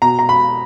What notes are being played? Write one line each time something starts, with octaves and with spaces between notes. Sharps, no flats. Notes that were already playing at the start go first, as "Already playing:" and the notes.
B2 A#5
A#5
B5